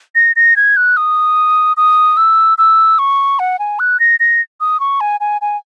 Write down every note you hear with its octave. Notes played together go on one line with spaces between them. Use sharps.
A#6
A#6
G#6
F#6
D#6
D#6
E6
E6
C#6
F#5
G#5
F#6
A#6
A#6
D#6
C#6
G#5
G#5
G#5